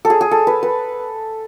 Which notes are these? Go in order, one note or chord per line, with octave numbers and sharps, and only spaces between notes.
A4
G#4
G#4
A4
B4
B4